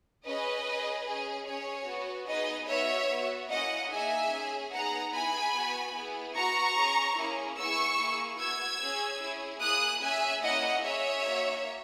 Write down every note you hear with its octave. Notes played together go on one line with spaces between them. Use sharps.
C#4 G#4 B4 D#5
C#4 G#4
C#4 G#4
C#4 G#4 C#5
B3 F#4
B3 D#4 G#4 B4 D#5
B3 F#4 C#5 E5
B3 F#4
A#3 C#4 E4 D#5 F#5
A#3 D#4 G#4 E5 G#5
C#4 G#4
B3 D#4 G#4 F#5 A#5
B3 E4 G#4 G#5 B5
B3 F#4
B3 E4 G#4
B3 F#4 A#5 C#6
C#4 G#4
A#3 C#4 E4 G#4
B3 E4 G#4 C#6 E6
A#3 E4 G#4
B3 F#4 E6 G#6
C#4 G#4
C#4 E4 G#4
A#3 E4 G#4 D#6 F#6
C#4 G#4 E5 G#5
A#3 C#4 E4 D#5 F#5
C#4 G#4 C#5 E5
A#3 D#4 F#4